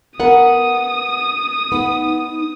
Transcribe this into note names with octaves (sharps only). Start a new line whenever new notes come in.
B3 A#4 F#5 D#6
B3 D#4